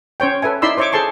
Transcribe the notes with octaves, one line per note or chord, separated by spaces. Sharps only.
C#4 C5 C#5 G5
A4 B4 E5 G#5
D#4 E4 D5 B5 C6 E6
C5 C#5 E5 C#6 D6
G#4 A4 C5 A5 C6 C#6